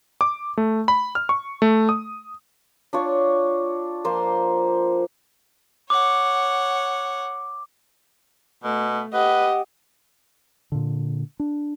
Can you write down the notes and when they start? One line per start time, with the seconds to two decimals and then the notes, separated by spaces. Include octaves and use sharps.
0.21 D6
0.57 A3
0.88 B5
1.15 F6
1.29 C#6
1.62 A3
1.89 D#6
2.93 D4 F4 C#5
4.04 F3 A#3 C5 C6
5.90 C#5 F#5 D6
8.63 B2 A3
9.14 G4 B4 D#5 F#5
10.72 A#2 D3
11.40 D4